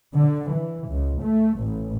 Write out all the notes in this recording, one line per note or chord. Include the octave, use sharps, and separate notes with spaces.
D3
E3
C#2
A3
A1